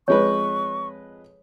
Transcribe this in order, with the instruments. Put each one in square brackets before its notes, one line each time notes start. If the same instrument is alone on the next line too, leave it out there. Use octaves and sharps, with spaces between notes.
[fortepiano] F2 G#3 B4 [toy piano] C#5 [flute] C#6